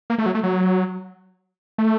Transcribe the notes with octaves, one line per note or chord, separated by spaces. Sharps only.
A#3
A3
F#3
A3
F#3
A3